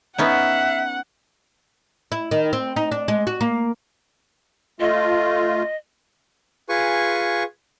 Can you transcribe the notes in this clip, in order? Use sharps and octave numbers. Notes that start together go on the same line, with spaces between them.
B3 C#4 D#4 E5 F#5
E4
D#3
C4
D#4
D4
G#3
F#4
A#3
A3 F4 D#5
F4 G#4 B4 G#5 C#6